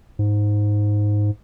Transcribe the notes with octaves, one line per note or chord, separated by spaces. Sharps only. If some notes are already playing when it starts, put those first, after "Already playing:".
G#2